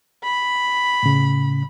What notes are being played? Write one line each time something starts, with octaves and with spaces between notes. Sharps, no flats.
B5
A2 C#3